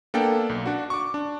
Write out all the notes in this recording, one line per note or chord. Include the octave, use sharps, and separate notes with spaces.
A#3 B3 D4 A4 G5
B1
D4 F#4
C#6 D6
D4